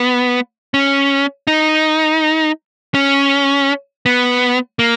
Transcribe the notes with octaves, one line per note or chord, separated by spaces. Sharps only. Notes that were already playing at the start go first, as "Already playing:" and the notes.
Already playing: B3
C#4
D#4
C#4
B3
A#3